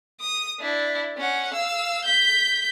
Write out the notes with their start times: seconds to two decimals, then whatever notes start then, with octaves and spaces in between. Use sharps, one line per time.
0.21 D#6
0.60 D4 E4
1.18 C#4 F#5
1.54 F5 E6
2.05 G6 B6